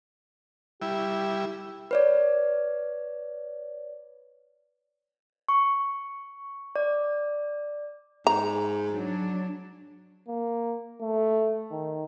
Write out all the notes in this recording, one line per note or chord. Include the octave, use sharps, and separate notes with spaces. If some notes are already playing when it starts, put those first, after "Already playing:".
G3 E4 G4
B4 C#5 D5
C#6
D5
G#2 A#5
F#3 D4
A#3
A3
D#3